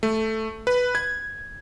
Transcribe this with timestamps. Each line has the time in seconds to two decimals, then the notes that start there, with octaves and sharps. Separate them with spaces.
0.03 A3
0.67 B4
0.95 G#6